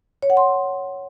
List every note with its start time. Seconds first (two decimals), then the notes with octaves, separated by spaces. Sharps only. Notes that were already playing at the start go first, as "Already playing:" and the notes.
0.22 C#5
0.30 F#5
0.37 C6